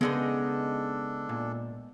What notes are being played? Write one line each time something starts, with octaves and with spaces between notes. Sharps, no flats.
C#3 G#3 B3 D4 D#4 A4 D#5 F#5
A#2